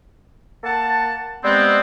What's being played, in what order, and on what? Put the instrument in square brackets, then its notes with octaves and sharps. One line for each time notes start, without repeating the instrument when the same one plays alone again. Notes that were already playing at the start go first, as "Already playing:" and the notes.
[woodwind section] A#3 F#5 A5
G3 G#3 B3 C4